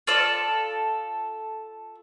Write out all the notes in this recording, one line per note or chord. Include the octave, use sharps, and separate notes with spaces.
F4 A4 D5